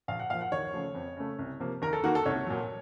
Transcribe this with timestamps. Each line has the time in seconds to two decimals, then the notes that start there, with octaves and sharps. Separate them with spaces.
0.08 A#1 F5
0.20 F#5
0.30 A#2 F3 F5
0.41 F#5
0.52 D#2 C#5
0.74 C#3 F3 A3
0.95 F2
1.17 C#3 A3
1.39 C2
1.60 C3 F3 A#3
1.82 D#2 A#4
1.93 A4
2.04 D#3 A#3 F#4
2.15 A4
2.26 C2 C#5
2.47 A#2 F#3